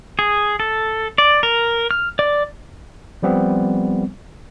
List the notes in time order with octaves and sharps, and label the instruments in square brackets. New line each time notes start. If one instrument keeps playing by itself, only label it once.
[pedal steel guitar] G#4
A4
D5
A#4
F6
D5
[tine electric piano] F3 G3 B3 C4